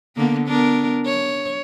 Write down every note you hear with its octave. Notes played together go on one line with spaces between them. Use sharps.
D3 A#3 B3
B3 D4 A#4
C#5